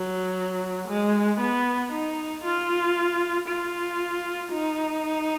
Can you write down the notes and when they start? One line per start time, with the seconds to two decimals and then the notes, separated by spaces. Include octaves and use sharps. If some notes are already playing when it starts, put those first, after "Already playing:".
Already playing: F#3
0.88 G#3
1.41 B3
1.92 D#4
2.44 F4
3.48 F4
4.51 D#4